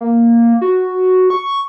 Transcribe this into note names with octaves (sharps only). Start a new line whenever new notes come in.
A#3
F#4
C#6